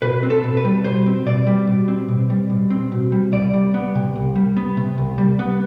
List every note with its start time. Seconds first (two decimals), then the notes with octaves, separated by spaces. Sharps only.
0.02 B2 B4
0.23 C4
0.30 A4
0.44 B2
0.57 B4
0.65 G3
0.84 B2 C5
1.06 C4
1.26 B2 D5
1.47 G3
1.67 B2
1.88 C4
2.09 B2
2.30 G3
2.50 B2
2.70 C4
2.92 B2
3.12 G3
3.32 C2 D5
3.53 G3
3.74 B3
3.95 C3
4.16 C2
4.36 G3
4.57 B3
4.77 C3
4.98 C2
5.18 G3
5.39 B3